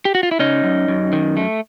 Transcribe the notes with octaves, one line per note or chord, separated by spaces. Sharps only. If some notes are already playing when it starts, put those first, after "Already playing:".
G4
F#4
F4
E4
C#3 C#4 D#4
F#2
F#2
D#3
A3